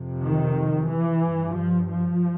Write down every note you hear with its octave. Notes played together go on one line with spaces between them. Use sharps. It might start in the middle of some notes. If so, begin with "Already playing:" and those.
Already playing: F2 C3
D#3
E3
G2
F3
F3